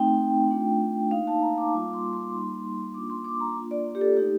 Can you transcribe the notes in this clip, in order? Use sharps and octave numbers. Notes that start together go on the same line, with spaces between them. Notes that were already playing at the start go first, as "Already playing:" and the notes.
Already playing: A3 C4 D#4 G5
A3 D4 F4
A#3 D#4 F5
A5
A#5
D6
G3 A#3 F4 D6
C6
C6
G3 A#3 D#4
A#3 D4 F4 D6
C6
D6
A#5
A#3 D4 F4
D5
G4
A4
A3 D#4 G4